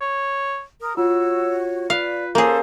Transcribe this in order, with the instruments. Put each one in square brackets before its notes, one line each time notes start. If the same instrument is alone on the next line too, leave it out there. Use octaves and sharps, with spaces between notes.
[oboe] C#5
[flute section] A#4 D#6
[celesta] F4 [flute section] F#4 C#5 [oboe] E6
[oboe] B4 [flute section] D5 [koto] F5
[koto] A#3 G#4 [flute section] C#4 A4 F5 [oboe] C5